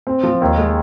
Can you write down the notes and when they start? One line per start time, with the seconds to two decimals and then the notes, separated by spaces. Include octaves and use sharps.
0.07 C4
0.23 F3
0.41 D#2
0.58 G#3